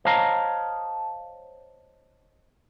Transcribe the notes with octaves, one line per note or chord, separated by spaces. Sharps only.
C5 C#5 D#5 F5 A5 A#5